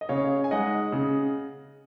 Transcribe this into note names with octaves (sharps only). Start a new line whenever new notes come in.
D#5
C#3 C#5 F5
G#5
G#3 D#4 D#5 F#5
C#3